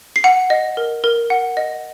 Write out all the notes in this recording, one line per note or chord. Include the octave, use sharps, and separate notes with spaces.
C7
F#5 C#7
D#5
A#4
A#4
F#5
D#5